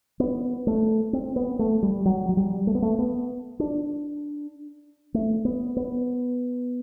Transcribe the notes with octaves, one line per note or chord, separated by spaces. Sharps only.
B3
A3
C4
B3
A3
G3
F#3
F#3
G3
A3
B3
A3
B3
D4
A3
B3
B3